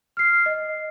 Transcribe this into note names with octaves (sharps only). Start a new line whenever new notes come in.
F6 C7
D#5